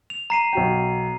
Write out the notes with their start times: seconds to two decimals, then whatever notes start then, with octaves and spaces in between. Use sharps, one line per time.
0.10 F7
0.30 A#5 C7 D#7
0.53 B1 F#4 G5